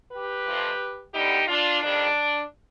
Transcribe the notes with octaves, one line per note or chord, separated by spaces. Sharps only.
G4 B4
F2 C3 F3
D2 D3 G3 B3 D#4 G4
D4 F4
F2 D#3 G3 D4